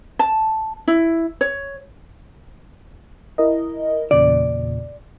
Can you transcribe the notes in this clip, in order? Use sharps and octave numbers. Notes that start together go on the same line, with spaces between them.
A5
E4
C#5
E4 A#4 D#5
E2 A#2 C#3 D5